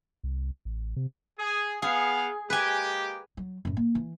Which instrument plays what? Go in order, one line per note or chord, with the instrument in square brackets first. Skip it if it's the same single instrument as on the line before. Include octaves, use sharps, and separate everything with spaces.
[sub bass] C2
A1
C3
[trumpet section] G#4
[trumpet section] B3 F5 [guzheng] G#4
[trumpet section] G#3 A#3 G4 [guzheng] B4 G#5
[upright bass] F#3
F#2 A2
A#3
E3